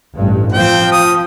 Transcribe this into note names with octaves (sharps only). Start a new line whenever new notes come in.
A1 G2
F3 C4 G5
D#6